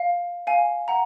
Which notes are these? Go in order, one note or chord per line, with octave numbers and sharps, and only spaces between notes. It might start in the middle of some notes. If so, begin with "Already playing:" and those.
Already playing: F5
F5 G#5
F#5 A#5